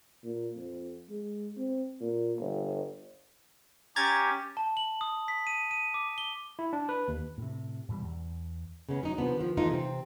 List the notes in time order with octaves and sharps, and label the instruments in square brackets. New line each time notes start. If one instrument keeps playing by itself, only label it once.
[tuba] A#2
F2
G#3
C4
A#2
G1
[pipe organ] C#4 G4 [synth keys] A#5 G#6 A6
[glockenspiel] A5
F#7
D#6
B6
D#7
D#7
D6
G7
[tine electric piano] E4
D4
B4
D#2
[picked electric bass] A2 C3
G#2 B2 E3 G3
E2
[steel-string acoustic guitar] C#3 G#3 B3 C#4
F#3 D#4
C3 F3 B3 D4
D#3 F3
E3 A3 D#4 F4
C3 C4